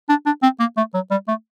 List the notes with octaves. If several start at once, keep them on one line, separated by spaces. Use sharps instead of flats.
D4
D4
C4
A#3
A3
F#3
G3
A3